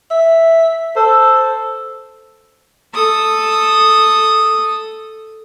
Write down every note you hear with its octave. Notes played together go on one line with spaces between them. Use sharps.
E5
A4 C5
A4 D#6